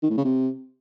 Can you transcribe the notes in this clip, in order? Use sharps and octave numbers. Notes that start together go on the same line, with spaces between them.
D#3
A2
C#3
C3